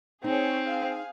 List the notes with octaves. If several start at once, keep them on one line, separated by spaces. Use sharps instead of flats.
C4 D#4 G#4 C#5
G#4 F5